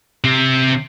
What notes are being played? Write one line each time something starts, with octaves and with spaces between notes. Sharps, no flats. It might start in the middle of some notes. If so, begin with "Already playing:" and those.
C3 C4